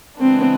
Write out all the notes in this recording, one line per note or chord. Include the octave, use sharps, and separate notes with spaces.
C#3 E3 G#3 B3 C4 D4